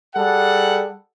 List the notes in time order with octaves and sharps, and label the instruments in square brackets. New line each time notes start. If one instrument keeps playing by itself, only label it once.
[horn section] G3 G#4 A4 F#5